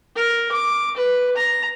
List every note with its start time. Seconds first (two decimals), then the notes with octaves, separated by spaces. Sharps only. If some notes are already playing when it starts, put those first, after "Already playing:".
0.16 A#4
0.52 D6
0.97 B4
1.37 A#5